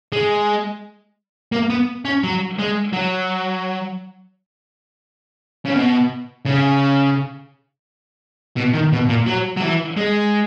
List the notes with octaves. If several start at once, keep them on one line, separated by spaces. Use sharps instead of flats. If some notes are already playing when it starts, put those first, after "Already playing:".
G#3
A#3
B3
C#4
F#3
G#3
F#3
C#3
B2
C#3
B2
D#3
B2
A#2
F#3
F#3
E3
G#3